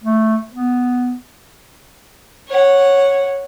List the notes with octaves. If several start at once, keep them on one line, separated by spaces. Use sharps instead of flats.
A3
B3
C#5 F#5